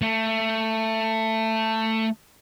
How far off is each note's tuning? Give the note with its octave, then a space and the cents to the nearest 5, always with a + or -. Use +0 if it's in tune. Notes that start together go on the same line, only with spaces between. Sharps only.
A3 +15